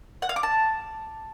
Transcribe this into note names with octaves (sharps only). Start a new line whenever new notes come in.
F#5
F5
D6
A5